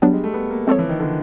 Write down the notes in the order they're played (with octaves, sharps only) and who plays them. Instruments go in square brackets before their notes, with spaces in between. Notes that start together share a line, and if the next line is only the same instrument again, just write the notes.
[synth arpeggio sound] F#3 B3 D4 [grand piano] G3
[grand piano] G#3
A3
B3
A#3
[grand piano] F3 [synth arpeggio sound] G#3 C4 F4 A4 C#5
[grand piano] E3
D#3
D3